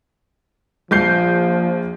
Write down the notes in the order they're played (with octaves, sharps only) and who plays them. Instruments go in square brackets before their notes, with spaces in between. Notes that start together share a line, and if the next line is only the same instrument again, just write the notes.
[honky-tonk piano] A#1 G6 C7 [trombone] F3